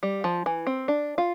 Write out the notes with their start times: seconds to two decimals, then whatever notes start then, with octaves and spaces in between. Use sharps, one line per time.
0.03 G3
0.24 F3
0.46 E3
0.67 C4
0.88 D4
1.18 F4